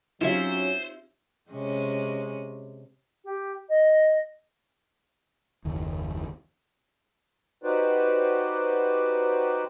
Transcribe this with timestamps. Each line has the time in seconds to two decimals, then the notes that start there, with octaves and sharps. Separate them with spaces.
0.21 F#3 C4 C#4 D#4 F4 G4 C5 E5
1.51 C3 G#3 C#4
3.24 G4
3.69 D#5
5.65 F#1 D#2
7.64 D#4 F#4 G4 B4 C5 D5